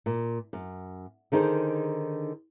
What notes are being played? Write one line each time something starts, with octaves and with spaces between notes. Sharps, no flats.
A#2
F#2
D3 D#3 D#4 G#4 C5